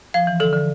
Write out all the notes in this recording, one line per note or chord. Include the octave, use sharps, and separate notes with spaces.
F3 F5
E3
D3 A4
D3